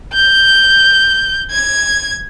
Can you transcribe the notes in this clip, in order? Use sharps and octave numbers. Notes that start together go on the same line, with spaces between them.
G6
G#6